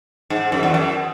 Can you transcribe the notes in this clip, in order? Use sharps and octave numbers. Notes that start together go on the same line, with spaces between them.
G#2
F#2
E2
F#2